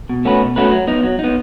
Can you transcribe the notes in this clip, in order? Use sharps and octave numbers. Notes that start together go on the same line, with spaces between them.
B2
A3 C#4 F#4 B4
B2
A3 C#4 F#4 B4
F#3
B3 D#4
F#3
B3 D#4